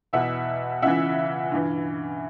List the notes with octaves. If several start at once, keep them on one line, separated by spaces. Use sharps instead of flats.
E2 B2 E5 F#5
C#2 C#3 E3 E5 F#5
G2 E3